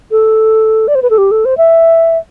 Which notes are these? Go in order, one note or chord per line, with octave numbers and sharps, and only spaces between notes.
A4
D5
C5
B4
A4
G4
A4
C5
E5